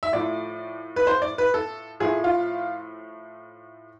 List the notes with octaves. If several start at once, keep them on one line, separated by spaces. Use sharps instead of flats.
E5
A2 F3 A3 D5
B4
C5
D5
B4
A4
A2 F3 A3 G#4
F4